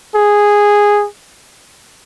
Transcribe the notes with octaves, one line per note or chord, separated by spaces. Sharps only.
G#4